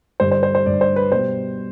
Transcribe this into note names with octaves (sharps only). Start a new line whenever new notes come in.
G2 D3 G3 C5
C5
C5
C5
G2 D3 G3 D5
C5
B4
B2 G3 C5